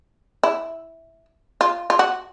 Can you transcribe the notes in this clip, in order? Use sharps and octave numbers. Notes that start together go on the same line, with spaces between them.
E4
F4
F4
F#4